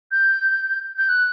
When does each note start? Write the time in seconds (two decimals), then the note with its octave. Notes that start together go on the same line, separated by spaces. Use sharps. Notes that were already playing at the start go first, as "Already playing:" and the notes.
0.11 G6
0.98 G6
1.09 F#6